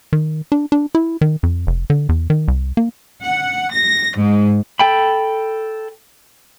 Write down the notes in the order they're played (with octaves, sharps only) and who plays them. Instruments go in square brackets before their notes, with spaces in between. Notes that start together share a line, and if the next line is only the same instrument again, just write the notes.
[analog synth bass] D#3
D4
D4
E4
D#3
F2
F1
D3
E2
D#3
C2
A#3
[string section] F#5
A#6
G#2
[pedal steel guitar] A4 G5 B5